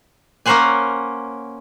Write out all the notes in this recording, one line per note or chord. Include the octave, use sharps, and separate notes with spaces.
A#3 C#4 A#4 C5 F#5 G#5